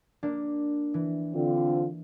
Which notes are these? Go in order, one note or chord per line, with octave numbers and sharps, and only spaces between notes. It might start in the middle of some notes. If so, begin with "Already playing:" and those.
A#3 D4
E3
D3 C4 F4